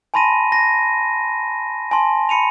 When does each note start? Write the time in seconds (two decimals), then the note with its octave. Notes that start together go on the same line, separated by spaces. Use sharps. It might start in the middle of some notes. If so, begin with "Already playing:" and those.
0.14 G#5 A5 B5 C6 A#6 D#7
0.52 A#6
1.91 G#5 A5 C6
2.29 B5 C#7 D#7 F7